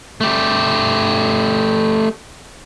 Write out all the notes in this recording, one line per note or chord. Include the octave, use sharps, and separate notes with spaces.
A3 G4